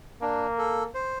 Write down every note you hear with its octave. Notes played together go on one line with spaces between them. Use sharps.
A#3 D4
A4
C5